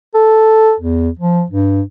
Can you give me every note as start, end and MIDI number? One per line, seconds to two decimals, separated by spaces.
0.14 0.73 69
0.80 1.09 40
1.19 1.43 53
1.50 1.81 43